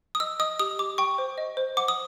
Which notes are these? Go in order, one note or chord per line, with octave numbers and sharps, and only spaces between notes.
D#6
D#5 E6
D#5 D#6
G4 D#6
G4 D6
G5 C#6
C5
D#5
C5
F#5 D6
D#6